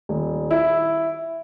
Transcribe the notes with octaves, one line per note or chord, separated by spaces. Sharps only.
D#1
E4